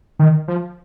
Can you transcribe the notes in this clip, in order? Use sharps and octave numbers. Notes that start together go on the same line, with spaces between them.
D#3
F3